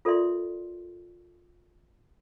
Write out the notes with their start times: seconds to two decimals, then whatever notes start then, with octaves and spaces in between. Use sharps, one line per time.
0.05 F4 A4 A#4 D5 E5 C6